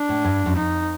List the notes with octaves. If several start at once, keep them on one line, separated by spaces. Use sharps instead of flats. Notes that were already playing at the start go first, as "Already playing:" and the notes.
Already playing: D4
A2
G2
F#2
F2 D#4